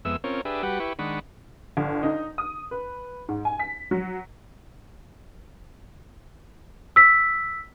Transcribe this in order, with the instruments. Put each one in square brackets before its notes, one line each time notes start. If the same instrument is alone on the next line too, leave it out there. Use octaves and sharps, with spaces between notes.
[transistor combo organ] F2 G#3 B3 E5 E6
C4 C#4 F4 A#4 C#5
D4 G4 G#4 B4 E5
G3 F#4 G4 B4 F#5
E4 G4 B4 C#6
D#3 G#3 D4 F#5 B5 C#6
[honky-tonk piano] G1
D#4
D#6
B4
G#2
G#5
B6
F#3
[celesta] E6 B6